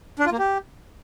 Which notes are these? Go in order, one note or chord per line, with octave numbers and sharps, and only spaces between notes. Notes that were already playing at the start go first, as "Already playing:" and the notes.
D4
F4
A#3
G4